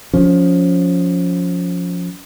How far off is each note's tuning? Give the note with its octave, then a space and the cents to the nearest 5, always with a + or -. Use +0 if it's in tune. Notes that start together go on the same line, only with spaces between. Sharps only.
F3 +20 C#4 +25